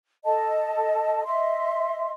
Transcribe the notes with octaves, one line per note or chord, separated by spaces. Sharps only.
A4 D#5 A5
D#5 E5 C6